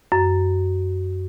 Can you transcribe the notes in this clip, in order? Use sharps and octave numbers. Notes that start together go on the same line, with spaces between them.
F#2